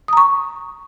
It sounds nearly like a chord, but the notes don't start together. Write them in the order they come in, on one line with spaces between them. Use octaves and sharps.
D#6 A#5 C#6